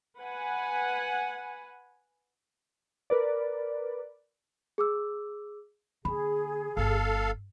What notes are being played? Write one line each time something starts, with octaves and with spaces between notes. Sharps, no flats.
B4 F#5 G#5
A#4 B4 D5
G#4 D6 E6
D3 A#3 G#4 B5
G1 A4 F5